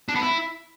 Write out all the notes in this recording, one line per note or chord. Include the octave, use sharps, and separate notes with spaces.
D4
B3
E4